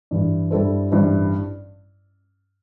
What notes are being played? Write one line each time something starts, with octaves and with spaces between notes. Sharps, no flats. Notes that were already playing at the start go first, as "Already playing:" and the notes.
G2 E3 G3
G2 G3 E4 A4 C5
A1 G2 G3 E4 C5